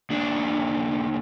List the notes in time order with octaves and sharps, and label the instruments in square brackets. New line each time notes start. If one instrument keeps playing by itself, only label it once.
[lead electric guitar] D#2 D4